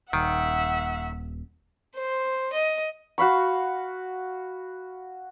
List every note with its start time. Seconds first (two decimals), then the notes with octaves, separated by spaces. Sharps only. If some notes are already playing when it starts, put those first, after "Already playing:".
0.13 D#1 D#3 E5 F#5
1.95 C5
2.52 D#5
3.18 F#4 F5 B5 C#6